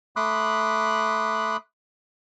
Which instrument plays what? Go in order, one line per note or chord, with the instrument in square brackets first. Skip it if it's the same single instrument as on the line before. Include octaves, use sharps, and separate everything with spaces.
[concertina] A3 B5 C6 D6 D#6 F#6